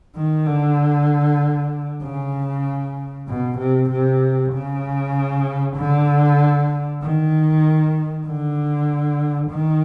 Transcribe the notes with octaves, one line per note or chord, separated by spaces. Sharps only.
D#3
D3
C#3
B2
C3
C3
C#3
D3
D#3
D3
D#3